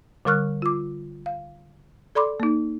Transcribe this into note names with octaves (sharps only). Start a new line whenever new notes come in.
D3 G3 A#4 C#6 F6 F#6
F4 D6
F5
A4 D5 B5 C6 D6
A#3 D#4